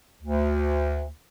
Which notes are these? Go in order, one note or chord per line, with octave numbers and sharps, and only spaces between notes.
D2